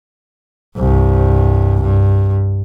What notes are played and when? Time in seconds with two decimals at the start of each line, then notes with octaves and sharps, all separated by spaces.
0.77 C2 G2
1.81 G2